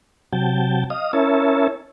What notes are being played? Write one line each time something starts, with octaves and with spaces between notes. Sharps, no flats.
C3 F#3 G5 A5
D#5 F5 D#6
C#4 E4 A#4 C#5 E5 A5